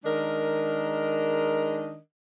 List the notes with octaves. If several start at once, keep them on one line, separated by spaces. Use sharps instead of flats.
D#3 G#3 D4 A#4 D#5